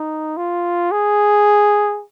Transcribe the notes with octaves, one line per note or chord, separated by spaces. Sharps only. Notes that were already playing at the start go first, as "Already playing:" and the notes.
Already playing: D#4
F4
G#4